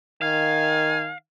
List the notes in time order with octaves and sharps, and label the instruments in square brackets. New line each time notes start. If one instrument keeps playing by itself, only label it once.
[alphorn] D#3 [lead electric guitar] F5 [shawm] G#5